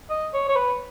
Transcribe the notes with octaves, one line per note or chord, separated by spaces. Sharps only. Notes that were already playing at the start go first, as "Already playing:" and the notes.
D#5
C#5
C#5
B4